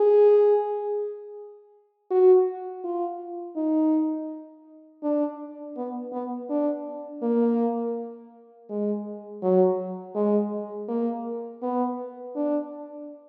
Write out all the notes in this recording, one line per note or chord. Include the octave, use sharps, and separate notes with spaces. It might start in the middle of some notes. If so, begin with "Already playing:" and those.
Already playing: G#4
F#4
F4
D#4
D4
B3
B3
D4
A#3
G#3
F#3
G#3
A#3
B3
D4